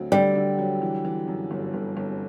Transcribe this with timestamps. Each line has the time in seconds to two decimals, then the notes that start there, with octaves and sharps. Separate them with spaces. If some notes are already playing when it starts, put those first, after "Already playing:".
Already playing: D2 F#3 C4
0.12 D3 G3
0.35 D3
0.59 F#3
0.82 E3
1.05 E3
1.28 F#2
1.51 G1
1.74 G1
1.97 G1